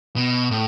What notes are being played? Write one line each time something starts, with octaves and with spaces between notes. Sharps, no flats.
B2
A2